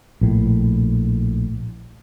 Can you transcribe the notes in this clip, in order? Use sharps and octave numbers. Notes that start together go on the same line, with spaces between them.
A#1 A2